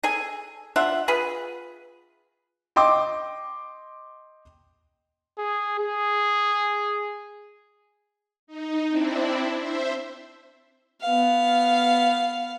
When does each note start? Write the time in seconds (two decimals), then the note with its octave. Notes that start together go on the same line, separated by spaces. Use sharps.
0.03 G#4 A4 G#5
0.76 D4 F4 E5 F#5
1.08 F4 G#4 B4
2.76 D#5 G5 C6 D6
5.38 G#4
5.80 G#4
8.47 D#4
8.89 C4 D4 E4
9.58 C5 E5
11.02 B3 F5